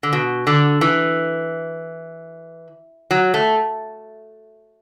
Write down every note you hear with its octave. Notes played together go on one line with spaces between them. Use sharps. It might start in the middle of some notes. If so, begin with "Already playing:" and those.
D3
B2
D3
E3
F#3
A3